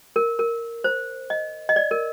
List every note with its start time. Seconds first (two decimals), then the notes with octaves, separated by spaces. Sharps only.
0.16 A#4
0.39 A#4
0.84 C5
1.30 D#5
1.69 D#5
1.76 D5
1.91 A#4